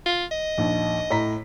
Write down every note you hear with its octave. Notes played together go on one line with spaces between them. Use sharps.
F4
D#5
A#1 D#2
A2 A#5 B6